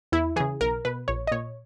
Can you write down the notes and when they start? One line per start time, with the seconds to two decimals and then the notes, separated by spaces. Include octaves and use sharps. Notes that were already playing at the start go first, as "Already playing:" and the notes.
0.12 E2 E4
0.36 C#3 E3 G#4
0.61 B1 A#4
0.85 B2 B4
1.08 A#1 C#5
1.27 D#5
1.32 A#2 C#5